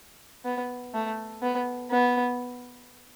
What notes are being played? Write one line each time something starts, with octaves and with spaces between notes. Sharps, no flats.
B3
A3
B3
B3